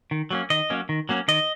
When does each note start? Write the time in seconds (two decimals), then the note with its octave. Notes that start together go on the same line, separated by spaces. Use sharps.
0.11 D#3
0.31 F#3 A#3 C#4
0.50 D#3 D#5
0.70 F#3 A#3 C#4
0.89 D#3
1.09 F#3 A#3 C#4
1.28 D#3 D#5